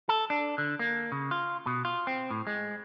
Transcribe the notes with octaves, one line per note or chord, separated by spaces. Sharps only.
A4
D4
D3
A#3
C#3
F4
B2
F4
C4
A2
G#3